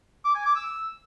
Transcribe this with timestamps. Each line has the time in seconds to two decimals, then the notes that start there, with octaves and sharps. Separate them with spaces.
0.24 D6
0.35 G#5
0.45 D6
0.55 E6